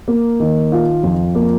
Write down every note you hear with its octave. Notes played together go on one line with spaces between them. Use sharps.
A#3
D#3
F4
F2
A#3